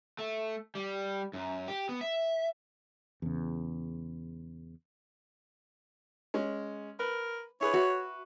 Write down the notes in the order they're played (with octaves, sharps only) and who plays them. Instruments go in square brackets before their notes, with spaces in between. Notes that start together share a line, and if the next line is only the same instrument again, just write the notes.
[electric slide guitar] A3
G3
F#2
G4
B3
E5
[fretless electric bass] E2 C#3
[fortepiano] G#3 C#4
[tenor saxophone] A#4 [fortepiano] B4
[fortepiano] E4 G#4 B4 [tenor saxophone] C#5
[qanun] F#4 [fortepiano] B4 E5